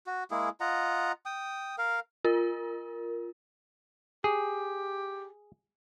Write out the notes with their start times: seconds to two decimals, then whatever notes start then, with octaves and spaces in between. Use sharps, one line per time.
0.07 F#4
0.31 G#3 A#3 E4 G#4
0.61 F4 D#5 F#5 A#5
1.26 G5 D#6
1.78 A#4 F5
2.25 F4 A#4
4.24 G4 G#4